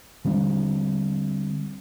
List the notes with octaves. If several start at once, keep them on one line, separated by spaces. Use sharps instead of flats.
D3 G3 C4 D4